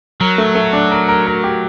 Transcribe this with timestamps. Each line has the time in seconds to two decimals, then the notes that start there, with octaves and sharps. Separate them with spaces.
0.21 F#3 A#4
0.38 A3
0.55 A3
0.73 D4
0.91 A#4
1.08 A#4
1.27 A#4
1.44 G4